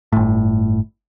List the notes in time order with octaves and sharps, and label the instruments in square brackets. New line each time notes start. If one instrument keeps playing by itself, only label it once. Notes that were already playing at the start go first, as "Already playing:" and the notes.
[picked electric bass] G1 A2